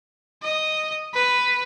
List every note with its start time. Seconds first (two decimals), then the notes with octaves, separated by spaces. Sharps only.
0.43 D#5
1.14 B4